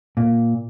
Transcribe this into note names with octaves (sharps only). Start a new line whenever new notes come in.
A#2